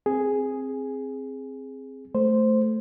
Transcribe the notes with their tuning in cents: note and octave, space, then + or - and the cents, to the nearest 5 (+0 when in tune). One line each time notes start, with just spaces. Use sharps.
C4 +10 G#4 +0
A3 +0 C5 +0